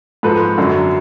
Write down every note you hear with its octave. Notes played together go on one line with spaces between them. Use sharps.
G#2 F3 A4 B4
F#2 D3 F#3